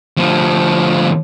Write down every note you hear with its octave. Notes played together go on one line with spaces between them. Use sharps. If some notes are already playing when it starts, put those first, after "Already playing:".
D2 F3